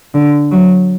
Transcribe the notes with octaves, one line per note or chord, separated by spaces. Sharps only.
D3
F#3